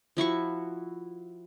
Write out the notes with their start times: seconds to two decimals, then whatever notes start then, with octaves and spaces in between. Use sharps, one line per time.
0.17 F3 E4 F#4 C#6